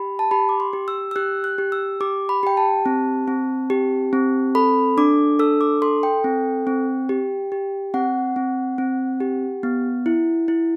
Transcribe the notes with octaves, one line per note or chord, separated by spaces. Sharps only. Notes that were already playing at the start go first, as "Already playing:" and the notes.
Already playing: G4 B5
A5
G4 B5
D6
C6
G4
E6
E6
G4 F#6
F#6
G4
E6
G4 D6
B5
G4 G5
A5
C4
C4
G4
C4
A4 B5
D4 D6
A4 E6
D6
A4 C6
G5
C4
C4
G4
G4
C4 F#5
C4
C4
G4
B3
E4
E4